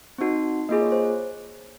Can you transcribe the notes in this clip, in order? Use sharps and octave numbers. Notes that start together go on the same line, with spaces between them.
C4 D#4 F#4
A#3 F4 G#4 D#5
C#5
C5